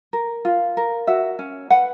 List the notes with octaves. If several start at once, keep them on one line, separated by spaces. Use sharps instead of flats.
A#4
F4
A#4
F#4 E5
C#4
B4 F#5